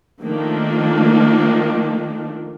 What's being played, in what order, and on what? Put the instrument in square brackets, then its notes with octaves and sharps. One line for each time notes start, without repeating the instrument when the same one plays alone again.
[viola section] D#3 F3 A3 A#3 D4